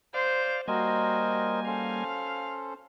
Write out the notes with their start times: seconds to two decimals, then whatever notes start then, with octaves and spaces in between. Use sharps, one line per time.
0.14 C5 D5 F5
0.68 G3 A#3 F#4 A#4 C5 D#5 G#5
1.67 C#4 A4 C5 F5